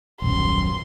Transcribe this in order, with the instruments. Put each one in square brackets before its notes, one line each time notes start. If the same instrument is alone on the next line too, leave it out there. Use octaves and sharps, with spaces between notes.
[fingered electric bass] D#1 B1 F#2 [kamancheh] C6